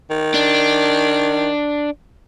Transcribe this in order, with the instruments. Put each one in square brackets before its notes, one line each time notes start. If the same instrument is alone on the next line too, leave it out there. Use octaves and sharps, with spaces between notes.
[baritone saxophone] D#3
[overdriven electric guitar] D4